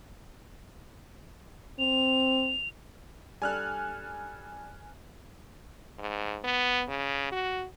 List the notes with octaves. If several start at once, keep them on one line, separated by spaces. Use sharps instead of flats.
C4 F7
G3 D4 A4 G#5 F6 F#6
G#2
B3
C#3
F#4